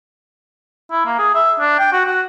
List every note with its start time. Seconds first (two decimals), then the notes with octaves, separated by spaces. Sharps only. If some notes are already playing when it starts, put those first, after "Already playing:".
0.91 E4
1.06 A#3
1.19 G#4
1.35 E5
1.60 D4
1.79 G5
1.93 F#4
2.06 F#4